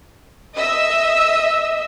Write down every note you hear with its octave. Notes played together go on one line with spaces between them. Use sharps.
D#5 E5 E6